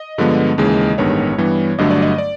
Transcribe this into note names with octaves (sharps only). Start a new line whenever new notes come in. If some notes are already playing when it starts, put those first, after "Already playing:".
Already playing: D#5
G2 D3 F3 G#3 B3
D#2 C#3 E3 G#3
A1 G2 D#3 G#3 B3 C#5
G2 E3 G3 B3
G1 G2 D3 F#3 A3 D#5
D5
D#5
D5